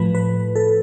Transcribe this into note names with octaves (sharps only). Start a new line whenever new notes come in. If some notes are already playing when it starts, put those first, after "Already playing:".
Already playing: A2 F3 A3 B4
B4
A4